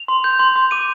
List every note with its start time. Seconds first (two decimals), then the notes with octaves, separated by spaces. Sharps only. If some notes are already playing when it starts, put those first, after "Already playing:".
Already playing: F7
0.08 C6
0.24 G6
0.39 C6
0.56 C6
0.71 D6 D#7